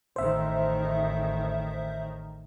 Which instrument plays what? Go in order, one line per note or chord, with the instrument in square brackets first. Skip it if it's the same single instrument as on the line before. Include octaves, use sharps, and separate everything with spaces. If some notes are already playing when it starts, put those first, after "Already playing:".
[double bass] A1 D#3 [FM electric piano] C5 E5